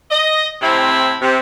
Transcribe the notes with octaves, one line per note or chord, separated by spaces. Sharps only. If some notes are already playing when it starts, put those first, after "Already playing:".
D#5
A2 C3 C4 E4
C3